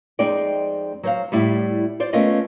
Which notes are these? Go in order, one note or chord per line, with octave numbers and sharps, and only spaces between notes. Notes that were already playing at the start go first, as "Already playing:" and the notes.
F2 G#3 C4 D#4 D5 G5
F#3 C5 F5
A2 G3 E4
F4 C5 D5
A3 B3 C#4 F4 A#4 D#5